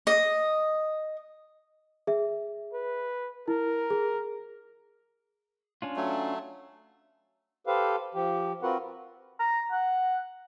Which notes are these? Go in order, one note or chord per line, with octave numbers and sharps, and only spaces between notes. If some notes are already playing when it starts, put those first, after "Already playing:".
D#5
G#4 E5
B4
E4 A#4
G#4
C#4 D4 F4
F#3 A3
G4 A4 B4 C5 F5
F3 G4
C4 F4 F#4 A#4 B4 F#5
A#5
F#5